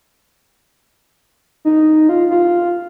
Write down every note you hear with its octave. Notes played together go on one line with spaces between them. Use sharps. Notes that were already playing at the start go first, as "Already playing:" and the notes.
D#4
F4
F4